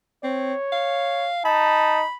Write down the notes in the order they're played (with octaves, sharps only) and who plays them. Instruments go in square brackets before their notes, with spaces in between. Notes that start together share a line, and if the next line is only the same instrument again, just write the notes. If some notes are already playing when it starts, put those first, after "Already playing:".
[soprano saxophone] C4 [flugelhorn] C#5
[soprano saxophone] F5
[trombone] D#4 [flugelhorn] A5 [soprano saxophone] B5